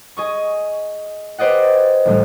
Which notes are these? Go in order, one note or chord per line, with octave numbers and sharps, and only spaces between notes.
G#4 D#5 C#6
G4 B4 C5 D5 D#5 F#5
A1 D2 A2 G3